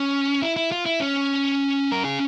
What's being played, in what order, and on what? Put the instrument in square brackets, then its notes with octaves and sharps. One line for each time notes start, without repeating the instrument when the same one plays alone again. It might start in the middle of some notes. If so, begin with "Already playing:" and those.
Already playing: [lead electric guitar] C#4
E4
E4
F4
E4
C#4
A#4
G#4